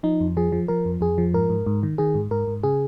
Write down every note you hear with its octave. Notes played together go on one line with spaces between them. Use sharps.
F3 D#4
F2
F3 G#4
F3
F3 A#4
F2
F2 G#4
F3
G#2 A#4
G#2
G#2
D#3
D#3 G#4
G#2
G#2 A#4
G#2
C#3 G#4